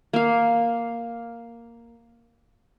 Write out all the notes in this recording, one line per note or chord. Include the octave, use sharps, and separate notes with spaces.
A#3 F5